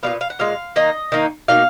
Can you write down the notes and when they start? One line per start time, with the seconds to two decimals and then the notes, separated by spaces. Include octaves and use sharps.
0.03 A#2 G#3 B3 F5
0.21 F5
0.30 F#5
0.39 A#2 G#3 F5
0.76 D#3 A#3 D#4 D#5
1.12 D#3 A#3 D#4
1.48 B2 A#3 D#4 F5